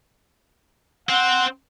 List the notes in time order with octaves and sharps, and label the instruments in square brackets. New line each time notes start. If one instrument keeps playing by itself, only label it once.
[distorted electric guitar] C4 [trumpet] F#5